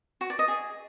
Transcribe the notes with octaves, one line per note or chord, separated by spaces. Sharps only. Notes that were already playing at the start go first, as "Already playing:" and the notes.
F#4
D5
D#5
G#4